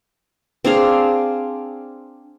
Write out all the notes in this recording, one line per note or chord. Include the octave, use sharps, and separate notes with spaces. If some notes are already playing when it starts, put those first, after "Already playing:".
C4 D4 G#4 F5